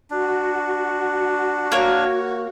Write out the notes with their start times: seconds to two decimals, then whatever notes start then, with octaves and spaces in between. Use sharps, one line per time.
0.10 D4 F#4
1.72 A#3 C#5